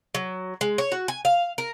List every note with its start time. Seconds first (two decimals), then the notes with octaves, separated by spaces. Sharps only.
0.15 F#3
0.61 G#3
0.78 C#5
0.92 F#4
1.08 G#5
1.25 F5
1.58 A#4